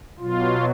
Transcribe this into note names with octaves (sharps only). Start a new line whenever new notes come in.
B2 F#3 F4